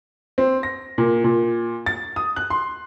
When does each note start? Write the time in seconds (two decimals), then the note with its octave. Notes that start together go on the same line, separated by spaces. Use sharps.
0.38 C4
0.63 A#6
0.98 A#2
1.24 A#2
1.86 A6
2.16 D#6
2.36 F#6
2.50 C6